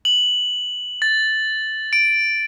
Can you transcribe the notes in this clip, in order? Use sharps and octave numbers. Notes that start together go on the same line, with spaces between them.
F#7
A6
D7